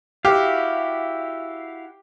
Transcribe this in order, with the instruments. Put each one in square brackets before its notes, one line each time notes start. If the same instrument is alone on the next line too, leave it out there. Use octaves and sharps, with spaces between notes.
[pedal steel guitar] E4 F#4 F5 [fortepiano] G4